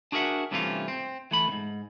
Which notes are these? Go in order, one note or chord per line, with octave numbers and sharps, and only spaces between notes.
D4 F#4 G#4 A#4 E5 F#5
G2 C3 E3 A3 C#4 F4
C4
E3 A3 B5
G#2 C3